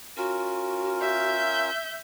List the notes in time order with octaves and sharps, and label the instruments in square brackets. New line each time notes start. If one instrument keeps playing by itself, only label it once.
[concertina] C#4 F4 A#4 [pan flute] F#4
[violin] E5 G6